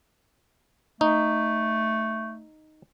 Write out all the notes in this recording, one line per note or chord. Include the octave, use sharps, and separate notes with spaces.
A3 D#4